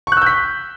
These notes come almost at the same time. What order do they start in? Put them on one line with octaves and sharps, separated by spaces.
C#6 F#6 E6 G6 B6